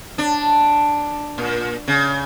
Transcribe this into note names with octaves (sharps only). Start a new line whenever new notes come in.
D4
A#2
C#3